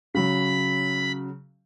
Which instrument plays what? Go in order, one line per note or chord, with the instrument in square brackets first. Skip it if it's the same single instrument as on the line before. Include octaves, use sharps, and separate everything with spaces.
[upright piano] C#3 F#3 [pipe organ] B5